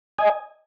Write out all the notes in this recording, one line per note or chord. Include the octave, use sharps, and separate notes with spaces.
D#5 G#5